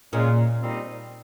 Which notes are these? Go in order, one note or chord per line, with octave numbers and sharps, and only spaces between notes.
A#2 C#3 G#3 C#4 F4
A#2 G3 C4 D#4